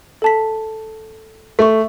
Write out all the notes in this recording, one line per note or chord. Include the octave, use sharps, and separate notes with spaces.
A4 A5 B6
A3 E5 C#6